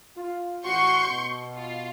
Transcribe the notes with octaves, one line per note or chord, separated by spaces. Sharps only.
F4
A1 F#4 C6 C#6 G6
B2
F4